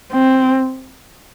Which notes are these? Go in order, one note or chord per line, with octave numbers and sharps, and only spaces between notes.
C4